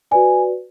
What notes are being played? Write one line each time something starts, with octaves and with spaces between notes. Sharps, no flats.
F#4 B4 D5 G#5